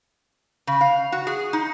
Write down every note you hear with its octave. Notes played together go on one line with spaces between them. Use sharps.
C#3
F5
F#4
G#4
D#4